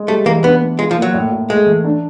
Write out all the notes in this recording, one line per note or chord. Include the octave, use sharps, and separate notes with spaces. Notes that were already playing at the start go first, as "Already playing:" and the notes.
Already playing: G#3
G3 A3
E3 A#3
B3 D4
B3
G#3 F4
F3
A#3
F#3
A2
A2
G#3 A3
E3
D4